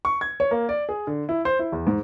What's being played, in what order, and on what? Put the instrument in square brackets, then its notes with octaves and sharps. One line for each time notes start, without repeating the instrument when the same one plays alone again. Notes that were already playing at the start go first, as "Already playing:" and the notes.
[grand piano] C#6
G#6
C#5
A#3
D5
G#4
D3
E4
C5
E4
E2
G#2